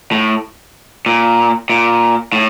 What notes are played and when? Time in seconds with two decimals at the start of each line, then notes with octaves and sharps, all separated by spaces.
0.12 A2
1.06 A#2
1.70 A#2
2.32 A2